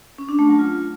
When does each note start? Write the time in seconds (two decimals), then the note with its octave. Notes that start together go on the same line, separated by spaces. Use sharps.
0.18 C#4
0.29 D4
0.39 A3
0.49 F#3
0.59 F4